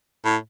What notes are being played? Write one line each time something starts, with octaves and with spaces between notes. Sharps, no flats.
A2